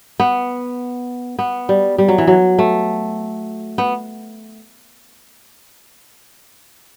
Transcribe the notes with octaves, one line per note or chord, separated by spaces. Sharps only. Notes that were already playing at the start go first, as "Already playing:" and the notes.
B3
B3
G3
G3
F#3
E3
F#3
A3
B3